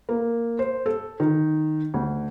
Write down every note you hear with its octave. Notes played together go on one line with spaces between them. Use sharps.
A#3
C5
A4
D#3
D2